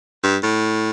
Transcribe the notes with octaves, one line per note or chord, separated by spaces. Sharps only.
G2
A2